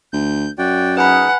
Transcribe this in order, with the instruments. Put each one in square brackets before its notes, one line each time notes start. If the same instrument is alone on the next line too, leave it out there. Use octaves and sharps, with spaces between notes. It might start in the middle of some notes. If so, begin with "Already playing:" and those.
[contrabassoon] D2 [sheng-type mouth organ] G6
[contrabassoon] F#2 [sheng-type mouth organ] F#4 D5 G5
[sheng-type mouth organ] D#4 G#4 [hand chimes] B4 G#5 B5 [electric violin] F#5